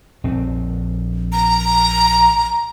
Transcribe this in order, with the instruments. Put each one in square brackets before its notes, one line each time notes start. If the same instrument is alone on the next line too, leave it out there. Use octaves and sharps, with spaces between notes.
[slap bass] A#1 C4
[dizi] A#5